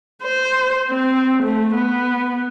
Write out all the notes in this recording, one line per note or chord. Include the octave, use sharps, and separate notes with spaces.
C5
C4
A3
B3